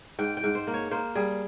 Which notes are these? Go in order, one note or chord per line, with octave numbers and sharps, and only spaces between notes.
G#2 G5
G5
G#2
C5
A#3
C#5
A#3 C5
G3 G#4